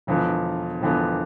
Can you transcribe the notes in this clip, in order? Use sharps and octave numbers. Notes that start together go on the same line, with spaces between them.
E1 E2 D3 F3 B3
E1 E2 D3 F3 B3